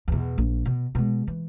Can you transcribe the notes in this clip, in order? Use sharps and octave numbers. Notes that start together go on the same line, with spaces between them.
E2 B2
A#1
B2
B2 G#3
E3